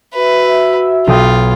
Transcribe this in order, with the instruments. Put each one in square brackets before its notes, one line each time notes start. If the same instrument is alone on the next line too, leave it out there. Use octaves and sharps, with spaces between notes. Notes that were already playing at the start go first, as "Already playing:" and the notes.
[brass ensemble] F#4 E5 [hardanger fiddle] B4
[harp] B1 G5 D#6 [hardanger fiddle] F4